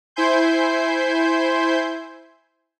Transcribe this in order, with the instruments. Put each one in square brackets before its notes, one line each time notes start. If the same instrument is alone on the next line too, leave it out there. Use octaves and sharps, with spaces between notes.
[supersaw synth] E4 C5 E5 G#5 C6 G6